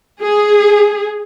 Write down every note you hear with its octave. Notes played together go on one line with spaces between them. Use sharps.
G#4